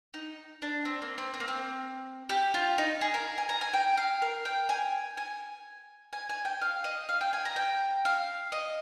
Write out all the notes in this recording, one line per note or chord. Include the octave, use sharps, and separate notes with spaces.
D#4
D4
C4
A#3
C4
C4
A#3
C4
G4
F4
D#4
G#4
A#4
G#5
A#5
G#5
G5
F5
A#4
G5
G#5
G#5
G#5
G#5
G5
F5
D#5
F5
G5
G#5
A#5
G5
F5
D#5